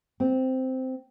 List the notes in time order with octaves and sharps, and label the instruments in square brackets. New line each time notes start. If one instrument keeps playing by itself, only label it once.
[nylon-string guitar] C4